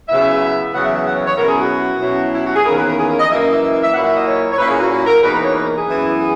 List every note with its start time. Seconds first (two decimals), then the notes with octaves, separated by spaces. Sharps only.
0.09 C#3 F#3 B3 E4 E5
0.73 E2 C#3 F#3 B3 F#5
0.83 E5
0.94 E5
1.05 F#5
1.16 C#5
1.26 C#5
1.37 B2 F#3 C#4 E4 A#4
1.48 G#4
1.58 F#4
2.01 B2 F#3 C#4 E4
2.34 E4
2.44 F#4
2.55 G#4
2.65 E2 D#3 A#3 C#4 E4 A#4
2.76 B4
2.87 A#4
2.98 G#4
3.08 A#4
3.19 D#5
3.29 F#2 E3 A#3 E5
3.40 D#5
3.51 E5
3.61 E5
3.72 E5
3.83 E5
3.93 A#2 F#3 A#3 E4 F#5
4.04 E5
4.15 D#5
4.26 C#5
4.51 C#5
4.58 A#2 A#3 C#4 E4 B4
4.68 G#4
4.79 F#4
4.90 F#4
5.06 A#4
5.22 E2 B2 A#3 D#4 B4
5.32 B4
5.43 C#5
5.54 B4
5.65 A#4
5.76 G#4
5.86 F#2 E3 B3 E4
6.18 G#4